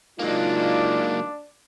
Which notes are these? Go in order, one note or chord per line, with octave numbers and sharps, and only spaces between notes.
F#3 G#3 A#3 D4 D#4 F4 D5